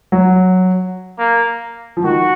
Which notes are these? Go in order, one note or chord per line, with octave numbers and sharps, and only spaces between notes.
F#3
A#3
F3
D#3 F#4